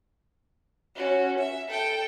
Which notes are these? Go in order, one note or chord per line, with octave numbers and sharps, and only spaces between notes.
C#4 F#4
E5
A4 G5